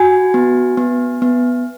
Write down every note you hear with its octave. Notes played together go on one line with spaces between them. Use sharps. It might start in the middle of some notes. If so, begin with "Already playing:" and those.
Already playing: F#4 G#5
B3
B3
B3